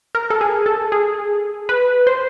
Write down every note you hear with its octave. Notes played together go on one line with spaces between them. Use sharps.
A#4
A4
G#4
A4
G#4
B4
C5